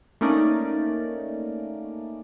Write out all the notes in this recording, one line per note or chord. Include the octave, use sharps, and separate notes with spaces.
A3 A#3 C#4 D#4 A#4 D5